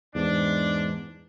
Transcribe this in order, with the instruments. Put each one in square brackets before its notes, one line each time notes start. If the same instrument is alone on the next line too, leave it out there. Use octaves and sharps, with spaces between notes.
[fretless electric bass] E2 G#2 [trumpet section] D4